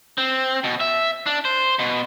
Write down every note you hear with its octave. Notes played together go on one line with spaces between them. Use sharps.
C4
B2
E5
D4
C5
B2